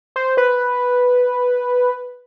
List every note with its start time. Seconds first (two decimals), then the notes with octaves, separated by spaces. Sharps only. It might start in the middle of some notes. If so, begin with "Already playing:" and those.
0.16 C5
0.37 B4